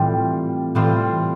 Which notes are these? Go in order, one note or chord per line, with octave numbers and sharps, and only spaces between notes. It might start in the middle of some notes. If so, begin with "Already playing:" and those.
Already playing: A2 E3 G3 C4 F4
A2 E3 G3 C4 F4